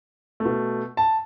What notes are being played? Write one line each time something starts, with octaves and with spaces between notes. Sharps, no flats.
A3
B2
A5